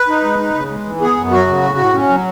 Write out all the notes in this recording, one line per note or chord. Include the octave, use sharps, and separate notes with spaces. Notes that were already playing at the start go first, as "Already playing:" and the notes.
Already playing: B4
D#4
G#3
D#4
C#3
G#3
E3
B3 G#4
F#2
F#3 F#4
C#3
A2
A2
C#4
F#3